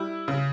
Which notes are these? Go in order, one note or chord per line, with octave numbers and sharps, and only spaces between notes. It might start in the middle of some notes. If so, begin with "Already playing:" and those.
Already playing: G3 E4
C#3